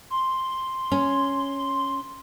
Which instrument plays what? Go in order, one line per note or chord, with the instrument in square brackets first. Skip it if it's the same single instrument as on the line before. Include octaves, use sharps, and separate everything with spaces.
[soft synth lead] C6
[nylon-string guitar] C#4